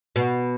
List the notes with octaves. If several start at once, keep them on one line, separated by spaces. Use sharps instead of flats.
B2